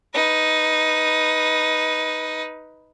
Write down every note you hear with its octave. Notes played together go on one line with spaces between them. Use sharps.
D#4 B4